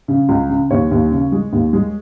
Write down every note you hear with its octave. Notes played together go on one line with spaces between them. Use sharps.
C#3
C#2
C#3
D#2 C#5
D#2
C#3
G#3
D#2
G#3